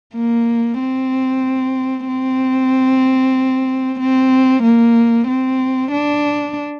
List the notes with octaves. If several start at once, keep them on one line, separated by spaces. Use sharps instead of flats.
A#3
C4
C4
C4
A#3
C4
D4